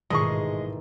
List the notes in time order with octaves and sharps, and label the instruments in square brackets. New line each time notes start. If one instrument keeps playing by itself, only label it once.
[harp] A1 D#3 C7 [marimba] G#2 B2 [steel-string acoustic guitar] G#3 [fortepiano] D#5 C#6